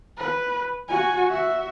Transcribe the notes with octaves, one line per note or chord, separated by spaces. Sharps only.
B4
F#4 G#5
F#4 E5